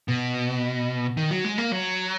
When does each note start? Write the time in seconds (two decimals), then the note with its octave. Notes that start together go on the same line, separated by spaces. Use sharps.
0.08 B2
1.17 D#3
1.31 F#3
1.45 G#3
1.58 A#3
1.72 F#3